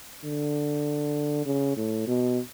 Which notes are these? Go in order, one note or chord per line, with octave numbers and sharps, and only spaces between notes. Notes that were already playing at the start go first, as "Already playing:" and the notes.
D3
C#3
A2
B2